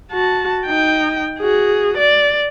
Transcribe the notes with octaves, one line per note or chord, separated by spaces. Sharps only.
F#4 A5
D#4 G5
F#4 G#4
D5